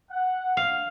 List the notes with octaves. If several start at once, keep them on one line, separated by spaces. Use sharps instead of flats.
F#5
F5